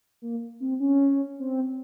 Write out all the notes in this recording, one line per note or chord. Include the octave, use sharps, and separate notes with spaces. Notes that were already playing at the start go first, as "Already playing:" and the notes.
A#3
C4
C#4
C4